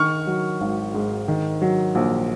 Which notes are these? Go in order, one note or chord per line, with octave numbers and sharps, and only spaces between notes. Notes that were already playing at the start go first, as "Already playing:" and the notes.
Already playing: D#3 C#6 F6
F#3
G#1
G#2
D#3
F#3
A#1